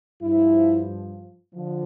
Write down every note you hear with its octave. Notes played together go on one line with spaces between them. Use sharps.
G2 F3 E4
D3 F3